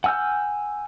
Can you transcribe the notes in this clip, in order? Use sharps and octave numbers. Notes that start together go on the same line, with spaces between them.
F#5 G#5 E6 F6 G6